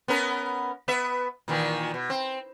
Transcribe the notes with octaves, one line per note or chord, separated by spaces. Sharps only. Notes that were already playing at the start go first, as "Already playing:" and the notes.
B3 C#4 A#4
B3 B4 E5
A#2 D#3 E3
B2
C4